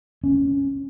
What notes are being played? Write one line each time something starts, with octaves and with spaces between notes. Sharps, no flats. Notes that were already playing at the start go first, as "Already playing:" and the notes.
C#4